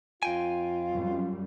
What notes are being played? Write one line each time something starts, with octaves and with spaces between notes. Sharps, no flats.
F2 F4 G5 G#5
F#2 G3